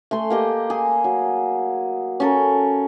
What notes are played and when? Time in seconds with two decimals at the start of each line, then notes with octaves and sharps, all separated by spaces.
0.11 A3 G#5 C6
0.30 A#3 G4 D#5
0.70 G#4
1.04 F#3
2.20 C#4 A4 A#4